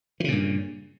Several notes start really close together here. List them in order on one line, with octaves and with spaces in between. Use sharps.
E3 C#3 A#2 G2